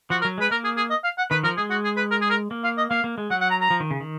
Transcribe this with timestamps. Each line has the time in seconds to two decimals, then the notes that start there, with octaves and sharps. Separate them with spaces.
0.10 F3 F#4
0.21 A#4
0.25 F#3
0.38 G#3 B4
0.51 A#3 A#4
0.64 G#4
0.77 G#4
0.90 D#5
1.04 F5
1.18 F#5
1.30 D#3 B4
1.43 F3 A#4
1.57 G#3 G#4
1.70 F#4
1.84 G#4
1.97 B4
2.11 A#4
2.21 G#4
2.30 A#4
2.51 A#3
2.64 F5
2.78 D#5
2.90 A#3 F5
3.04 A#3
3.18 G#3
3.30 F#3 F#5
3.41 F#5
3.50 A#5
3.61 A#5
3.70 F3
3.80 D#3
3.91 C#3
4.00 D#3